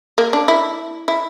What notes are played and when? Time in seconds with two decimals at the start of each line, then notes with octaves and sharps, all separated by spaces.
0.18 A#3
0.33 D4
0.48 E4
1.08 E4